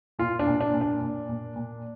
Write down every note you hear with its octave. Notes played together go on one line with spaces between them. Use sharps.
A#2 F4
D4
A#2
D4
A#2
D4
A#2
A#2
A#2